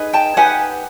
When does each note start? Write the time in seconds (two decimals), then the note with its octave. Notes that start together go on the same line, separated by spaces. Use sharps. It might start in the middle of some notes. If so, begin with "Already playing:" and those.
Already playing: D#4 G#4 B4
0.13 G5 A5
0.36 D#4 G4 B4 F#5 G#5